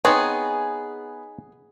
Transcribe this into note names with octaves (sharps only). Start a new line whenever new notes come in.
B3 C4 D#4 G#4 C#5